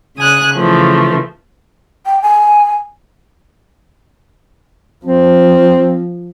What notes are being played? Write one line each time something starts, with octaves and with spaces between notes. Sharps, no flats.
C#3 G#5 D#6 F#6
C#3 E3 F3 A3
G5
G#5
F3 C4